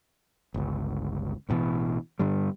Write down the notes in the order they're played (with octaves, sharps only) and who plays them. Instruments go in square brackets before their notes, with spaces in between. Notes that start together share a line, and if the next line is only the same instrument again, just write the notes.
[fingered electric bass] G1 C#2
A1 G2 B2 E3
G2 D3 G3